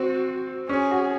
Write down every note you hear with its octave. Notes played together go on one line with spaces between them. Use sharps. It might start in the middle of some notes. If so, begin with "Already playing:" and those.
Already playing: C4 F#4
C#4 G#4
F#4